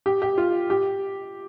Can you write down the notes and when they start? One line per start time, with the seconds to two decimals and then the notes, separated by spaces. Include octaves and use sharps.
0.06 G4
0.22 G4
0.38 F4
0.70 G4